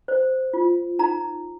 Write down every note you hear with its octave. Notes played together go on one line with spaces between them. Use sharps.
C5
F4
D#4 A#5